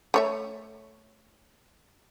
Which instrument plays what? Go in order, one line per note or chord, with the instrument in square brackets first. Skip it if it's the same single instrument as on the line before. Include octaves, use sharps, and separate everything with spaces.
[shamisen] A3 C#5 E5